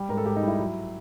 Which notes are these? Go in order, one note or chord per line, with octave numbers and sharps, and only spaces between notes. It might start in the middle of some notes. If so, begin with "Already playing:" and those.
Already playing: G3
G#2 A#4
A4
G#2 G4
D#4
G3 E4
F#3